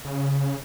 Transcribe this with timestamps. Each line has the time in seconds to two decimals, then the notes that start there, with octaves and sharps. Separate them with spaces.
0.05 C#3